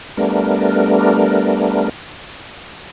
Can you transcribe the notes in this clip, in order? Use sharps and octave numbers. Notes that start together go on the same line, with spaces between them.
G3 A3 B3 D4 A#4